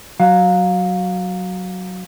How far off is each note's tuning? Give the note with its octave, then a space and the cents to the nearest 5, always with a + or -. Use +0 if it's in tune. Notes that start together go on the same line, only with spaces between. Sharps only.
F#3 +0 F5 +25